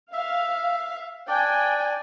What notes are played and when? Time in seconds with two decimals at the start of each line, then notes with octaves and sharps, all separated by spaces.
0.13 E5 F5
1.28 D4 D5 G5 G#5